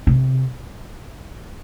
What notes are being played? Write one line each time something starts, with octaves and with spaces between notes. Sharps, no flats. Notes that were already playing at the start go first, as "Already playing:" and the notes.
C3